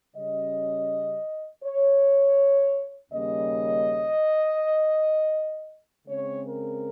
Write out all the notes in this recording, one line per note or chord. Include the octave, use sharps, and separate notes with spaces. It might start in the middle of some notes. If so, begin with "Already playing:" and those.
C#3 G3 C#4 D#5
C#5
D#2 C#3 G3 A#3 C#4 D#5
C#3 G#3 C4 C#5
A#4